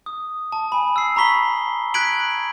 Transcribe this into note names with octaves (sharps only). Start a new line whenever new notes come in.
D#6
A5
G#5 B5
E6 C7
A#5 B5 C#6 B6 G7
F#6 G#6 B6 D7 F#7